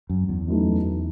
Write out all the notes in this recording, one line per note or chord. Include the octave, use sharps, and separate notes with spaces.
F#2
E2
F#2 E3 A3 D#4